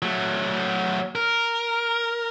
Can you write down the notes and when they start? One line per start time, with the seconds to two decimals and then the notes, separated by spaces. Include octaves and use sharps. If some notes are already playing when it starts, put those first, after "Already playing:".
0.02 F#3 A3
1.15 A#4